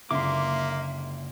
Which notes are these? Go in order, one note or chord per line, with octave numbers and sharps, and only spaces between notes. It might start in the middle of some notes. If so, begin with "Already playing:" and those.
F#1 C#2 D3 A#3 E5 C6 D6